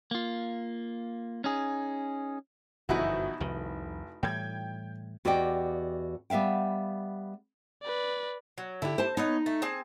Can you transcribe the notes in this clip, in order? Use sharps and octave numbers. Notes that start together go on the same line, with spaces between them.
A#3 F4
C#4 D#4 G#4
G1 F#2 B2 E3 F3 D#4 E4 F#4
F1 C2 F2 D#3
A2 E3 G3 G5 G#6
E2 F#4 G4 D5 D#5 G5
G3 B3 E5 F5 G5
B4 D5
F#3
D3 E4 G4
C5 A5
B3 D#4 C#5 D#5
A3
C4 G#4 A5